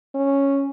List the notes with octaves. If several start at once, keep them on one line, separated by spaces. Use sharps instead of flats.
C#4